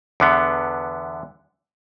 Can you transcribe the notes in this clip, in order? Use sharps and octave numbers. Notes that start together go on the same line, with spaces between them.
E2 D3 B3